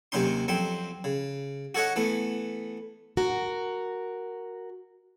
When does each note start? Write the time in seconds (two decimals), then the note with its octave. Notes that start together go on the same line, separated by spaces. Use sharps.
0.12 D#2 C3 F#3 C#4 D#4 C6
0.48 F2 F#3 C4 C6
1.04 C#3
1.75 F#4 A4 C#5 D#5 F#5
1.96 E3 A3 B3
3.17 F#4 A#4